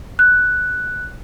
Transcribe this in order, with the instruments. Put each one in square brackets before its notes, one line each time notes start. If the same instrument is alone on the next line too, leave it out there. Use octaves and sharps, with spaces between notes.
[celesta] F#6